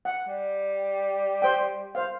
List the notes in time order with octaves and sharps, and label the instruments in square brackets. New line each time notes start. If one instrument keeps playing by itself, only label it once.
[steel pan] F#5
[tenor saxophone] G3
[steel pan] C5 G5
C5 F5